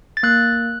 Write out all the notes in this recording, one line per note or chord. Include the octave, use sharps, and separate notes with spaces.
A6
A#3 F#6